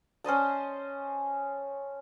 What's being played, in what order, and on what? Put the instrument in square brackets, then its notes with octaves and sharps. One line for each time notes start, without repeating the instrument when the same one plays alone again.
[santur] C#4 C5 D#5 A5